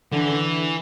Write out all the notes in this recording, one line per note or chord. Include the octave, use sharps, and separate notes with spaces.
D3 E3